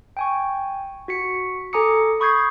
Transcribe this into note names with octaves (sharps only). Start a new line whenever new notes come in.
G5 G#5 C#6
F#4 B6 C#7
A4 G#5 A#5 D6 D#6 C#7
B5 C#6 D#6 G6 G#6 C7